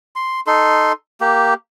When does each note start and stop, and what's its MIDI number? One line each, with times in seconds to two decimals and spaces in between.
0.16 0.40 84
0.47 0.92 63
0.47 0.92 69
0.47 0.92 84
1.21 1.54 58
1.21 1.54 67